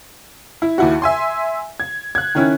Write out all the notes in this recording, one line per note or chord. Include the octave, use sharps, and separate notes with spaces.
E4
D#2 E4 F#4
E5 G#5 C6
G#6
F#6 G#6
D#3 C#4 E4